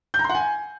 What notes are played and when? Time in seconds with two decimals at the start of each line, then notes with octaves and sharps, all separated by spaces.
0.14 G6
0.19 A#5
0.24 C6
0.29 F#5
0.35 G#5